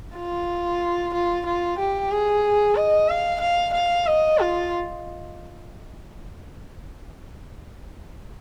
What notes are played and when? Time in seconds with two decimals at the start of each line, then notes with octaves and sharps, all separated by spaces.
0.16 F4
1.14 F4
1.46 F4
1.79 G4
2.11 G#4
2.76 D#5
3.09 F5
3.40 F5
3.73 F5
4.06 D#5
4.38 F4